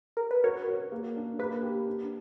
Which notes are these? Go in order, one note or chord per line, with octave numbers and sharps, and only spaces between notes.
A#4
B4
F#4 A#4 C#5
F#4
A#3
D4
A#3 B4
G4
D4